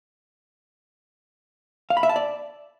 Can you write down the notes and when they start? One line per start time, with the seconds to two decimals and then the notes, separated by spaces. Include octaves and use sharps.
1.90 F5
1.97 B5
2.03 E5
2.09 A5
2.16 D5